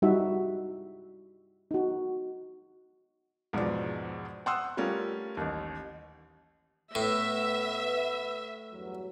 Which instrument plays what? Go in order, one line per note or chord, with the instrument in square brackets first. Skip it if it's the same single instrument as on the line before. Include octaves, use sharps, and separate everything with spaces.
[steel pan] G3 D#4 E4 F#4 E5
D#4 F#4
[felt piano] E2 G#2 B2 F3 D4
F#5 G5 C6 D#6 E6 F#6
G3 A3 C#4 F4 A#4
A1 D#2
[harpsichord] A2 [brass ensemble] B3 B4 [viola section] E5
[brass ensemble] E2 G2 F#3